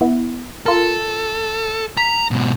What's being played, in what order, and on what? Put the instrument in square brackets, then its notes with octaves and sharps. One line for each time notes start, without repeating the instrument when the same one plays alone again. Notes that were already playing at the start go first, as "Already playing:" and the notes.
[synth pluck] B3 E4
[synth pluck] F4 A#4 [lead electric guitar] A4
[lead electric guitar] A#5 [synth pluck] B6
[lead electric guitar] G#2 B2